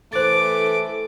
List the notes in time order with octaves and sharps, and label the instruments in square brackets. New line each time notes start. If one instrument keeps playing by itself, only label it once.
[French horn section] E3 A3 A4 [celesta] C5 A6 [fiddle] D6